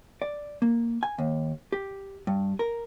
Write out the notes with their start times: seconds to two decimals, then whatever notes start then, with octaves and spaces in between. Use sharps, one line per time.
0.22 D5
0.62 A#3
1.03 G#5
1.18 D#2
1.72 G4
2.27 G2
2.59 A#4